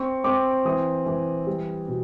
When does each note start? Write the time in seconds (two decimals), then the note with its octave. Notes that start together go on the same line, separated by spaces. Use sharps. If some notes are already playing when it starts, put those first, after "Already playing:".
Already playing: C4 C#6
0.24 C4 D6
0.65 E3 D#6
1.06 E3
1.47 G3
1.88 B2